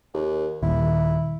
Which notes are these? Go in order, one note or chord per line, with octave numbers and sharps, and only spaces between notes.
D#2
D#1 D#2 E4